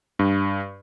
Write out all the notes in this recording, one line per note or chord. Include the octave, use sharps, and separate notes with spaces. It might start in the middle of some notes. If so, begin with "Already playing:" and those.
G2